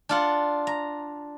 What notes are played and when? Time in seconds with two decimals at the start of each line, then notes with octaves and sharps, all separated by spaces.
0.09 D4 F4 F#5
0.67 A#5